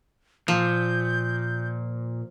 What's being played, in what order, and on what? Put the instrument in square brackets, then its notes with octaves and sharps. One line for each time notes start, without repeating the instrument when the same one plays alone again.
[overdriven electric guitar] A#2 [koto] F3 [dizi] G6